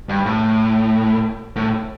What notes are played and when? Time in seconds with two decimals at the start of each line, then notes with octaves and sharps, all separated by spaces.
0.09 G2
0.26 A2
1.56 A2